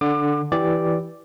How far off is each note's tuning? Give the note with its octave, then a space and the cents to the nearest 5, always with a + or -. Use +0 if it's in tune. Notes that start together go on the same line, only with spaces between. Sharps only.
D3 +0 D6 +30
E3 +0 G4 -5 D5 +0